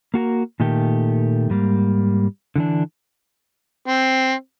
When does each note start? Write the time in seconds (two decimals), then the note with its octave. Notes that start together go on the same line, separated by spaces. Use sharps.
0.14 A#3 F#4 A4 A#4
0.60 A#2 D#3 A3 G4 A4 A#4
1.50 G#2 G3 A#3
2.56 D3 E3 D4
3.87 C4